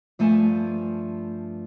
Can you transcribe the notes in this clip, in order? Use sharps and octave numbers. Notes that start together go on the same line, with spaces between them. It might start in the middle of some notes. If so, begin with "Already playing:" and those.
G2 F3 A3 G#5 A5